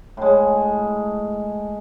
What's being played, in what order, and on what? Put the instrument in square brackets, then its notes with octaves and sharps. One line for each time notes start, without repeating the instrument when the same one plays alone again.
[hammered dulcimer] A2 G#3